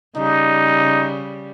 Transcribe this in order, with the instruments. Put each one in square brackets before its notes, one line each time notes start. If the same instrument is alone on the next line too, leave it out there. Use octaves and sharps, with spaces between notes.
[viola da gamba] C#3 G3 [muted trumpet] D#4